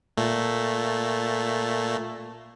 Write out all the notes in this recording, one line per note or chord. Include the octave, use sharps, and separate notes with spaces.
A#2 A3